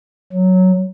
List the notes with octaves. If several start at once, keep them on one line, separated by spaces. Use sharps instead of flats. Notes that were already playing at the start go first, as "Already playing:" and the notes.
F#3